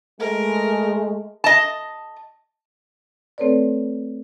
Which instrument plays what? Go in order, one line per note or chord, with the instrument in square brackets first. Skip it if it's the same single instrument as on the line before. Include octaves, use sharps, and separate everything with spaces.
[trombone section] G#3 A3 [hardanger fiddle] A#4
[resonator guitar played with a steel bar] D#5 A5
[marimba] A3 C4 A4 B4 C#5 D5